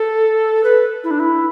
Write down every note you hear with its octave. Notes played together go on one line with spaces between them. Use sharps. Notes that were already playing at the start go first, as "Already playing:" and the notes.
Already playing: A4
B4
E4
D4
E4